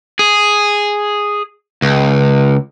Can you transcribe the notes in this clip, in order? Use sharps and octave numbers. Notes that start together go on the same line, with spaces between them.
G#4
C#2